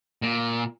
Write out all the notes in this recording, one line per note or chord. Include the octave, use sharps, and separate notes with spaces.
A#2